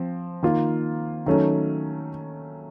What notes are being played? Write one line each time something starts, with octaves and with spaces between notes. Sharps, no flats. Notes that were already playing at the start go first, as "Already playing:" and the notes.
Already playing: F3 C4
D#3 A#3 F4
D#3 F#3 A3 C#4